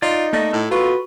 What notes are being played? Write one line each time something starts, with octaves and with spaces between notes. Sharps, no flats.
D#4 F4 D5
A3 A#3 D5 D#5
A2 A4
F4 F#4 B4